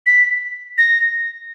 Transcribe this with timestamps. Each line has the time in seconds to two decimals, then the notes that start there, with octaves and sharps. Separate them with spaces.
0.06 B6
0.78 A#6